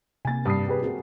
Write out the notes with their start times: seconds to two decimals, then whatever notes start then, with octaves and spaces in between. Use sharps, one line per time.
0.25 C3 A#3 G#5 A6
0.45 G2 D#6 C7
0.68 G4 G#4 B4
0.83 C3 F#4 G#4 A#4